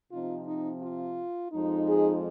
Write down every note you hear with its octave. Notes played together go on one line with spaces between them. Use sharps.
C3 F3 C4 D#4 F4
D#4
F4
F2 F3 G#3 D#4
G#4